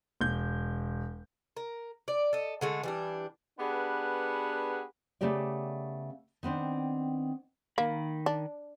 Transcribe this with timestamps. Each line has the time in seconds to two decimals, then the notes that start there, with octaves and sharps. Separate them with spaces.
0.21 E1 G6
1.57 A#4
2.08 D5
2.33 A4 D#5
2.61 D3 G#3 A3
2.83 E3 G3 D4
3.59 B3 D4 G4 G#4 B4 F#5
5.21 C#3 A3 B3 G4 D5
6.43 D#3 B3 C4 D4
7.78 D#3 A#3 B5
8.26 D4